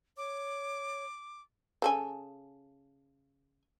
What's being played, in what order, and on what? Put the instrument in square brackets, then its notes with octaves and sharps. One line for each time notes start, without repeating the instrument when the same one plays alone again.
[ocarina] C#5 [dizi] D6
[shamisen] C#3 A4 G#5